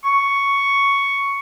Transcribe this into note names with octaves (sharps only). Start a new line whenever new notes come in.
C#6